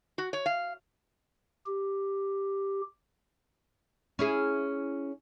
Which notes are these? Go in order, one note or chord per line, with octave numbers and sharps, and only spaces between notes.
F#4
C#5
F5
G4
C#4 E4 G#4